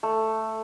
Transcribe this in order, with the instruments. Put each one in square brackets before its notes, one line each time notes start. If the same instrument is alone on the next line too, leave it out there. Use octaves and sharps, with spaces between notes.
[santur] A3